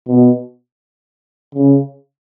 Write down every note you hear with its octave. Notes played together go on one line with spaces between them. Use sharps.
B2
C#3